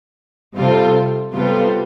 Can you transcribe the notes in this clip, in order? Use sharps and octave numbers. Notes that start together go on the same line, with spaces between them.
C3 G3 C4 F4 A4
C3 G3 B3 F4 A4